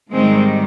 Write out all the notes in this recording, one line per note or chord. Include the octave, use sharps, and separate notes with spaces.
G#2 D#3 G3 G#3 C4